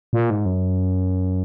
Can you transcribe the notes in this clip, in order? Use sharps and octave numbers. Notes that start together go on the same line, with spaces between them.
A#2
G#2
F#2